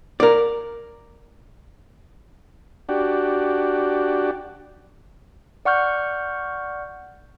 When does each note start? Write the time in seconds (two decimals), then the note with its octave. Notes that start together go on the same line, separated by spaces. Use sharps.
0.20 A#4 D5
2.89 D4 F#4 G4
5.65 D5 F#5 C#6 F6 G6